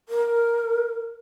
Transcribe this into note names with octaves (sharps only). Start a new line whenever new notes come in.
A#4